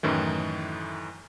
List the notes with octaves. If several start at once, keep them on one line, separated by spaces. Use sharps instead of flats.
F#2 A2 D#3 E3